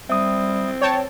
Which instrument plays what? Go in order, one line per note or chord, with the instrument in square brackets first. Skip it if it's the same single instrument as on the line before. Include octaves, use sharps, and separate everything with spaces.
[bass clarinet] G3 [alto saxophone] C4 [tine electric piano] E5 D#6
[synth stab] C#5 G5 A5